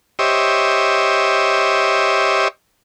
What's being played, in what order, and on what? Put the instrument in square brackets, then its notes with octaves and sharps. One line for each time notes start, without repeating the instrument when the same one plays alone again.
[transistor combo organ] G4 C5 C#5 D#5 E5